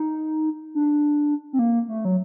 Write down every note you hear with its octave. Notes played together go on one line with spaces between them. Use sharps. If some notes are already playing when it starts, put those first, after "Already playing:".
Already playing: D#4
D4
C4
A#3
A3
F#3